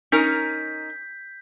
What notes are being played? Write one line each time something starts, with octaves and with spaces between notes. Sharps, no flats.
C#4 D#4 A#4 G6 B6